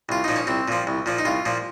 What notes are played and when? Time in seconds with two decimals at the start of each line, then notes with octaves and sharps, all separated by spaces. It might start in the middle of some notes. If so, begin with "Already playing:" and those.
0.09 C2 F4
0.24 A#2 F3 D#4
0.36 C#4
0.47 C2 C4
0.68 A#2 F3
0.87 C2
1.06 A#2 F3
1.18 D#4
1.25 C2 F4
1.45 A#2 F3